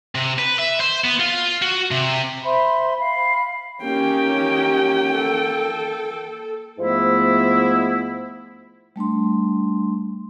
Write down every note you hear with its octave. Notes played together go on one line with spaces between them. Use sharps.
C3
B4
E5
C5
B3
F4
F#4
C3
C5 E5 B5 C6
F5 B5
A#3 C#4 D#4 G4 G5
A4
G#2 F3 A3 B3 E4
G3 A3 D4 C6